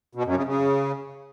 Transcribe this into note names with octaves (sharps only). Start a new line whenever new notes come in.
B2
F#2
C#3
C#3